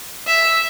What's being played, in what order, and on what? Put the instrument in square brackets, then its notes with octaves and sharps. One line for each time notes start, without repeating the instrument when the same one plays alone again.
[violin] E5